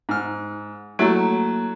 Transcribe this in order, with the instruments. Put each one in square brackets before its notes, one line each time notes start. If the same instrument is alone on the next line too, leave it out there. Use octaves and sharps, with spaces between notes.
[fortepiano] G#2 F6
[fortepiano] F#3 A3 E4 [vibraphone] A#3